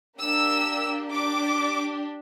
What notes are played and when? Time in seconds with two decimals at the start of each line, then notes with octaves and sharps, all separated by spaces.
0.18 A#3 D4 G4 E6
1.11 D4 G4 D6